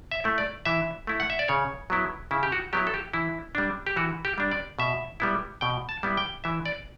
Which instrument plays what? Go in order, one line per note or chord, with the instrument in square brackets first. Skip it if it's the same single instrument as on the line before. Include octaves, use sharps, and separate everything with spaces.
[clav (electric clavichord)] E5
A3 E4
D5
E3 E5
A3 E4
F#5
E5
D5
C#3 C#5
F#3 B3 E4
C#3 E4
G4
F#4
F#3 B3 E4 G4
A4
G4
E3 E4
G3 D4
G4
E3 F#4
G4
G3 D4
D5
B2 E5
G3 B3 E4
B2 G5
A5
G3 B3 E4
G5
E3 E5
D5